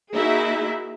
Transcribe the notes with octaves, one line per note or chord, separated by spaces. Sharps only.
A#3 D#4 E4 F#4 G#4 E5